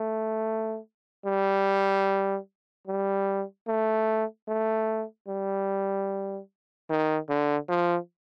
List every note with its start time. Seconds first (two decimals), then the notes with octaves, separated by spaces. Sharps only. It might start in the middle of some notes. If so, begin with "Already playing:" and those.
Already playing: A3
1.26 G3
2.87 G3
3.68 A3
4.48 A3
5.28 G3
6.90 D#3
7.29 D3
7.69 F3